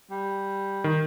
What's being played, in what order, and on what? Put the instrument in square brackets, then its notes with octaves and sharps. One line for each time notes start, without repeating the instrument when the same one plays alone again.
[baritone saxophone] G3
[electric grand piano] D#3